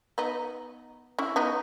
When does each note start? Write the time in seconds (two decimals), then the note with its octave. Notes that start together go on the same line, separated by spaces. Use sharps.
0.18 B3 D#4
1.19 C#4 E4
1.36 B3 D#4